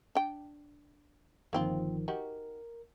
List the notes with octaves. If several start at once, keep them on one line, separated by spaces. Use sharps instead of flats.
D4 G5
G1 D#3 F3 A#3 C4 F4
D#4 F#4 G4 A#4